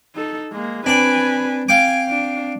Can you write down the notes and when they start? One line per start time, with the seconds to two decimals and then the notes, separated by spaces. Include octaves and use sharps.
0.15 D#4 A4
0.52 G#3 A#3
0.86 C4 D4 B4 D5 G#5
1.69 F5 G5 G#5 D6
2.09 D4